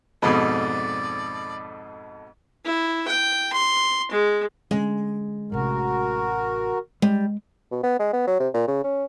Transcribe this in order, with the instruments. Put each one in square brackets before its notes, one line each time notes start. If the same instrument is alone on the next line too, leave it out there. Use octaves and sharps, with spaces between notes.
[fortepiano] F2 G#2 B2 [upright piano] A4 D#5 B5 [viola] D5
[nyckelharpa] E4
G5
C6
G#3
[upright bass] D3 C#4 [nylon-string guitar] G#3
[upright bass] A1 C3 [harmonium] F#4 A#4
[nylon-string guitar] G3 [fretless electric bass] G#3
[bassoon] B2
B3
G#3
B3
F#3
C3
A#2
C#3
C#4